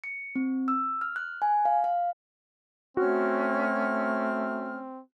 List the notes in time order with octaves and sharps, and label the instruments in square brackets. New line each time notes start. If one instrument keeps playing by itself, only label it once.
[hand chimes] C#7
C4
E6
F6
F#6
G#5
F5
F5
[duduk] A3 [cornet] C4 [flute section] C#4 F6 [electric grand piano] F#4